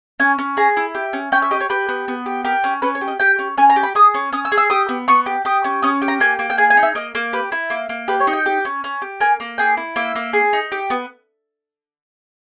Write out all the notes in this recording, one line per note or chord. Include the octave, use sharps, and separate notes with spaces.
C#4 G#5
C#4
G#4 A#5
E4
G4
C#4
C#4 G5
E5
G4 D#5
C#5
G4 B4
B3
B3
G4
G4 A#4
C#4
C#4 B4
C#5
G4
D#5
G4 G5
C#4
C#4 G#5
A#5
G4
B5
G#4 D#6
C#4
C#4 D#6
E6
G#4
E6
G4 D#6
B3
B3 C#6
G4
G4 D#6
C#4
C#4 D#6
G4
A#5
A#3 G#5
A#3
G5
G#4 G#5
G#5
D#4
E5
A#3 D#5
A#3
G4 B4
E4
A#3
A#3
G4 B4
C#5
D#4
G5
G4
C#4
C#4
G4
A#3 G#5
A#3
G#4 G5
E4
A#3 E5
A#3
G#4
D#4
G4
B3